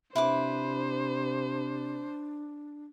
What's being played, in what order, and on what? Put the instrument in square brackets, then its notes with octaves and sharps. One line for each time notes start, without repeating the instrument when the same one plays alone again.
[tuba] C3 [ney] D4 [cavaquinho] E4 B4 D6 [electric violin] C5